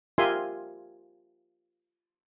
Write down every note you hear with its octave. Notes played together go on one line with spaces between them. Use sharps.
F4 G4 A#4 E5 G#5 C6